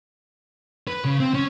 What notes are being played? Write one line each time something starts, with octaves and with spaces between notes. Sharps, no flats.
B4
C#3
C4
C#4